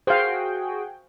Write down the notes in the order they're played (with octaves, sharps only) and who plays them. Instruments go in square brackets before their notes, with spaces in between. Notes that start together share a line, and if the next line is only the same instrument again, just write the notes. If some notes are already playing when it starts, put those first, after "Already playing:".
[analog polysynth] F#4 G#4 G5 [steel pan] C5 F5